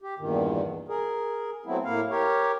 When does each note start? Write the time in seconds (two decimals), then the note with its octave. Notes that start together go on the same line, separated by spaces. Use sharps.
0.02 G4
0.18 E2 G2 A#2 D#3
0.88 G#4 A#4
1.66 F#3 A3 B3 C4 E4
1.84 A2 A#3 E4 F5
2.10 G4 A#4 C#5